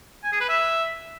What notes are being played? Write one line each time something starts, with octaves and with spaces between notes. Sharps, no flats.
G#5
G#4
B4
E5